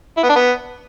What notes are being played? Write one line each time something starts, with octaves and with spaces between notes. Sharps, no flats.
E4
B3
D4
B3